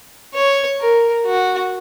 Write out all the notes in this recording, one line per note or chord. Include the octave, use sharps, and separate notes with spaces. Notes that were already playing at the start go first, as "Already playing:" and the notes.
C#5
A#4
F#4